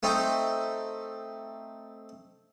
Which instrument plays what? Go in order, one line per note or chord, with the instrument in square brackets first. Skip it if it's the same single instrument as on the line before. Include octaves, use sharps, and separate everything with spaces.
[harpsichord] A3 C4 D#4